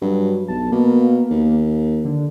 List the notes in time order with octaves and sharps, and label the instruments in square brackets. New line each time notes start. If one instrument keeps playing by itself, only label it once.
[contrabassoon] G2 [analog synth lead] F#3
[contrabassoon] B1 [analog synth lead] A5
[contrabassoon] B2 [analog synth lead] A#3
[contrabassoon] D#2
[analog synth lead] D3